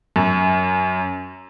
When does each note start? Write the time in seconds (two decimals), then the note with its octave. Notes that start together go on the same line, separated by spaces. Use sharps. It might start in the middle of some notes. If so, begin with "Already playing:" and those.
0.16 F#2